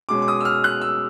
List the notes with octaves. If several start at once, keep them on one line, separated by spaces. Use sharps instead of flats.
B2 G#3 C#4 D6
D6
D#6
E6
F6
F#6
E6